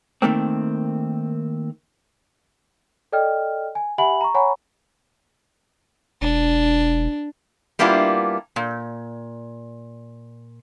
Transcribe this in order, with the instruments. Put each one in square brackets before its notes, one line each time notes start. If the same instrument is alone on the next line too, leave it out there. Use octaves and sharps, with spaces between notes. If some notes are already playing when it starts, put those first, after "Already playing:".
[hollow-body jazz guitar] D#3 A3 A#3 C4
[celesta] A4 D5 D#5 G5 F6
G#5
G4 E5 F#5 G#5 B5 F#7
A#5 C#6
C#5 F#5 G#5 A#5 B5 C#6
[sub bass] E1 [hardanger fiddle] D4
[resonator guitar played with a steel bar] G3 A#3 B3 D4 E4 F4
A#2